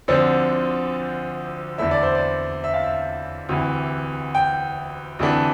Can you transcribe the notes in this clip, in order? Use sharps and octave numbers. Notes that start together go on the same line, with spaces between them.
D2 D3 F3 C4 C5
E2 D3 A3 E4 E5
D5
C5
D5
E5
F5
E5
D2 C3 E3
G5
D2 C3 E3 A3 D4